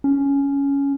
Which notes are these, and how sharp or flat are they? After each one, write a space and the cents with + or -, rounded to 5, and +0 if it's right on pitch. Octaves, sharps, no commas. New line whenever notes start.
C#4 +10